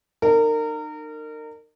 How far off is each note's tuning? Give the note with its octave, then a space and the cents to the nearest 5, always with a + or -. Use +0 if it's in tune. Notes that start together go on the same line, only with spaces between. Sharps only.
D#4 -35 A#4 -30